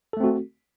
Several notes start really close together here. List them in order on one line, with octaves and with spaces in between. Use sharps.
A4 A3 C4 F#4